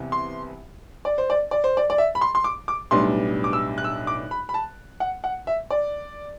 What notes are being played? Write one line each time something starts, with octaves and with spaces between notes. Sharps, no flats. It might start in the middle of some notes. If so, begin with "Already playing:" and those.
Already playing: C2 C3 E3 B3
C6
D5
C5
D5
D5
C5
D5
D5
E5
B5
C6
C6
D6
D6
B1 A2 G3 B3 D4 C6
D6
E6
F#6
E6
D6
B5
B5
A5
F#5
F#5
E5
D5